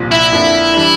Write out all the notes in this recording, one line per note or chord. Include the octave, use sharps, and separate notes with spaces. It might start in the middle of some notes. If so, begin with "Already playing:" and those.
Already playing: C2 A#2 F3
E4
F2 D3 F3 A#3 D4
E3 G3 D4